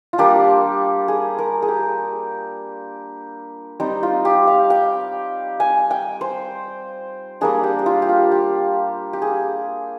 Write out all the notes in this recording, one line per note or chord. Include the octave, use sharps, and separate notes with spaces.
F4
G3 A#3 D4 G4
G#4
A#4
G#4
G4
G3 C4 D#4
F4
G4
F5
G5
G#5
G5
C5
G3 A#3 D4 G#4
G4
G4
F4
G4
F4
G4
G4
G#4